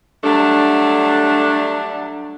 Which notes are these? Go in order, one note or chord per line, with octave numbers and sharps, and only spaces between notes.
F#3 G3 A3 D4